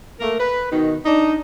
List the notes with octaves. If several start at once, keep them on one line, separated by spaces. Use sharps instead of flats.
A3 A#3 A#4
B4
B2 D#3
D4 D#4